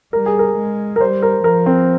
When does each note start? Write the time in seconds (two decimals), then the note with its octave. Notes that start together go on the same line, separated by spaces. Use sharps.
0.13 G3 A#4
0.26 G#4
0.39 A#4
0.57 G#3
0.96 A#4
1.00 G3 C5
1.22 A#4
1.44 F3 A#4
1.66 C4